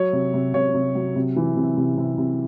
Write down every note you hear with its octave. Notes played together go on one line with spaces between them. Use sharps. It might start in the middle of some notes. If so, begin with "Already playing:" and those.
Already playing: F#3 C#5
C3
C3
C3 C#5
C3
F#3
C3
E3
C3
C3
C3
C3